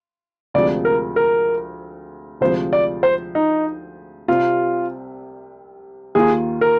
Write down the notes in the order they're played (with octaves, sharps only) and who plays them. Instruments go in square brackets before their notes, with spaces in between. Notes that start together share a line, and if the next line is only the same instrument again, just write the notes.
[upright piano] D2 C3 F3 G#3 [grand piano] D5
[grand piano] A#4
A#4
[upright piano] D2 C3 F3 G#3 [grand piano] C5
[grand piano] D5
C5
D#4
[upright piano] C2 C3 G3 C4 [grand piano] F4
[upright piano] D#2 D#3 A#3 F4 [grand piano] G#4
[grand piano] A#4